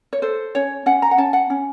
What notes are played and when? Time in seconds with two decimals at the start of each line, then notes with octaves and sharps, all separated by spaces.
0.13 C#5
0.22 A4 C5
0.55 C#4 C#5
0.86 C#4 F#5
1.02 A#5
1.11 F#5
1.18 C#4 A5
1.33 F#5
1.50 C#4